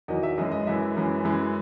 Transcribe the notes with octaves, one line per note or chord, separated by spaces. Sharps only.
E2 D#3 F#3 D#5
E5
F#2 E3 G#3 D#5
D#5
F#2 E3 G#3 E5
F#2 E3 G#3
F#2 E3 G#3